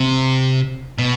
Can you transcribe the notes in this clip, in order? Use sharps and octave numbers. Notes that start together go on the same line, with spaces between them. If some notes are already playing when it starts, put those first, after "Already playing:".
Already playing: C3
B2